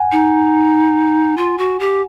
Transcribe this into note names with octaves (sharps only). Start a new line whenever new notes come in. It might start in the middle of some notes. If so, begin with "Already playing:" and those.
Already playing: F#5 G#5
D#4
F4
F#4
G4